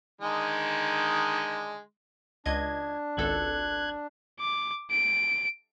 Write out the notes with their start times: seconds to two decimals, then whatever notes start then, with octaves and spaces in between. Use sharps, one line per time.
0.21 D3 D#3 G#3
2.46 C#2 D4 D#5 G#6
3.17 G#1 C#2 A4 F#6 G#6
4.40 D6
4.91 D7